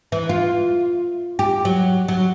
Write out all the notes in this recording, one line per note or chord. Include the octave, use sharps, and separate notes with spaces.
E3
F4
G4
F#3
F#3